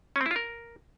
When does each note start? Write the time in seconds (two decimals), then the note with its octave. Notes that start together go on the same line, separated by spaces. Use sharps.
0.16 C#4
0.21 C4
0.26 E4
0.31 F4
0.36 A#4